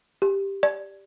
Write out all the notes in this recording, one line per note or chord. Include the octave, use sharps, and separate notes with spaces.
G4
D5